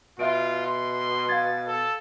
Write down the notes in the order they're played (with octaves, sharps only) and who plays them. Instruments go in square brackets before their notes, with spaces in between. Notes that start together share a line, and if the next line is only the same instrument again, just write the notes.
[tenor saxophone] B2 [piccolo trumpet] F4 [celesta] E5 D7
[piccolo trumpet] C6
[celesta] F5 G#6 [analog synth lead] A6
[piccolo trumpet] A4